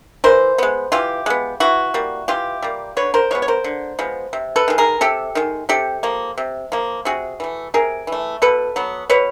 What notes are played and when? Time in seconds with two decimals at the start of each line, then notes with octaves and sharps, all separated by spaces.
0.24 E3 A#4 C5
0.58 G#3 B3
0.92 E3 F4 G4
1.26 G#3 B3
1.60 E3 E4 F#4
1.94 G3 A#3
2.28 E3 F4 G4
2.63 G3 A#3
2.97 D3 B4 C#5
3.14 A#4 C5
3.31 F3 G#3 B3 C#5
3.42 C#5
3.48 A#4 C5
3.64 D3
3.99 F3 G#3 B3
4.33 C3
4.56 A4 B4
4.68 D#3 G#3
4.78 G#4 A#4
5.01 C3 G4 A4
5.35 D#3 G#3
5.69 C3 G4 A4
6.03 F3 A#3
6.38 C3
6.72 F3 A#3
7.05 C3 F#4 G#4
7.40 E3 A3
7.74 C3 G#4 A#4
8.07 E3
8.12 A3
8.42 B2 A4 B4
8.76 F#3 B3
9.10 B2 B4 C#5